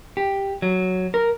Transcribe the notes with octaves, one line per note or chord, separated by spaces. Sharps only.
G4
F#3
A#4